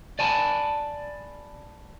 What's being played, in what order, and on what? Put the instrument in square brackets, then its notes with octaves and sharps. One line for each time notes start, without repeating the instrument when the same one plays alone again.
[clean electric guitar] D5 G#5 A5 B5